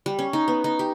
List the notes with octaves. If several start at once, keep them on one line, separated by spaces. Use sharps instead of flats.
G3
C#4
D#4
B3
D#4
G4